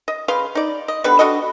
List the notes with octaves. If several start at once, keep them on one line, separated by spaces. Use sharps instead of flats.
D#5
C#3 B4 F5 C6
D#4 D5
D#5
D3 G3 B3 B4
D4 F#4 A4 D#5